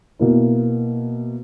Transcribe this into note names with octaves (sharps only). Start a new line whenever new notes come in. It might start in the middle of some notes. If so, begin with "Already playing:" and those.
B2 A#3 E4